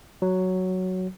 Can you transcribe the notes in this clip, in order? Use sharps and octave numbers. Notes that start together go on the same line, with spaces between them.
F#3